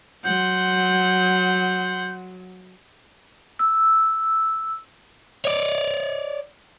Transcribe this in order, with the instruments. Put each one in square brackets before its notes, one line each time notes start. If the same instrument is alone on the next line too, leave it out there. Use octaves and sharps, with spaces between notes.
[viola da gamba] F#3 [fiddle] F#5 C6 [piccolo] G6
[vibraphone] E6
[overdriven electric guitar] C#5 D5